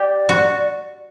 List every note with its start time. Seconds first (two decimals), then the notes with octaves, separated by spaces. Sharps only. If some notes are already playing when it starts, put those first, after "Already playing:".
Already playing: G4 D5
0.29 F#4